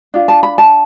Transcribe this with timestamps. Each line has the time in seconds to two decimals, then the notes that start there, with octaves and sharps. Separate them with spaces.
0.14 D4 F4
0.28 A5
0.43 B5
0.58 A5